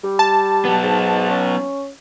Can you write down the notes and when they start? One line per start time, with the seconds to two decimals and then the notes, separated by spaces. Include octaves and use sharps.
0.04 G3
0.19 A5
0.65 F#3 B3
0.82 G#2
1.30 C#4